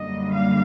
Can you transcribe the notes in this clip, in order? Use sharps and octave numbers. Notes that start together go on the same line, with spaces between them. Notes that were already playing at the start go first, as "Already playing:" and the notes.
Already playing: F#2 D3 G3 A#3 D#5
F5